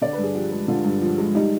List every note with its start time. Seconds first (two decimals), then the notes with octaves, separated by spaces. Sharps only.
0.02 D3 D5
0.13 B4
0.18 G2
0.24 G#4
0.35 F3 G4
0.52 G#3
0.68 D3 F4
0.84 G2
1.02 F3
1.18 G#3
1.34 G3 D#4